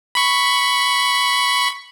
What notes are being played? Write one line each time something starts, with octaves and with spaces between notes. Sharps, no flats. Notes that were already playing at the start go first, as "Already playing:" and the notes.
B5 C#6